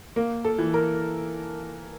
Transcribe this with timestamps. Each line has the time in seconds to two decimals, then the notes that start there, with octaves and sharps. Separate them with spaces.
0.16 A#3
0.45 A4
0.58 E3
0.74 A#4